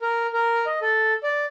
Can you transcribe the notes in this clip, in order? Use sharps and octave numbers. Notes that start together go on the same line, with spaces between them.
A#4
A#4
D#5
A4
D5